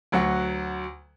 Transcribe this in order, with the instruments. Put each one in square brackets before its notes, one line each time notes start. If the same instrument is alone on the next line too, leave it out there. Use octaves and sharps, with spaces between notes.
[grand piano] D2 F#3 F#5